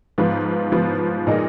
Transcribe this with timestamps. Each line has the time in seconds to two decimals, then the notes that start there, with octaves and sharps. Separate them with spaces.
0.18 G#2 F3 B3 F4 B4
0.72 G#2 F3 B3 F4 B4
1.27 A#2 G#3 D#4 A#4 D#5